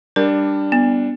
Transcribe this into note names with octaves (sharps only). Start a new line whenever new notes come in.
G3 D4 A#4
B3